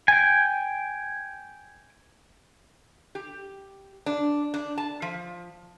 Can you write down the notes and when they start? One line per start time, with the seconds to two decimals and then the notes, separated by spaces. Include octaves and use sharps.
0.08 G5 G#5
3.15 G4
4.06 D4
4.54 D4
4.78 A5
5.02 F3